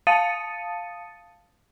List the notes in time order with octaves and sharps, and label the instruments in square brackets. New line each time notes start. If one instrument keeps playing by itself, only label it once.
[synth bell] F5 A5 D#6 A6 C#7 D#7